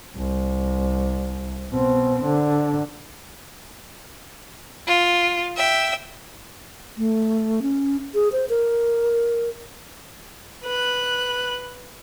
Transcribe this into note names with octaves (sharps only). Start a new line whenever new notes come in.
C2
B2 C4
D3
F4
E5 G5
A3
C#4
G#4
C5
A#4
B4 F#6